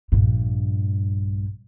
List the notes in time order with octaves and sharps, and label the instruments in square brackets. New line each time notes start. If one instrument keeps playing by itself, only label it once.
[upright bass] A#1 G2